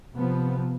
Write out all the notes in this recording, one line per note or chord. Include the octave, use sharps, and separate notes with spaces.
C3 F3 B3